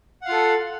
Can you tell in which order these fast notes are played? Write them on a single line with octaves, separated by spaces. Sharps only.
F#5 F5 F4 A4